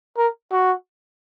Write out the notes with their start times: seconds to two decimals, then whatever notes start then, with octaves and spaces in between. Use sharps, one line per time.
0.17 A#4
0.52 F#4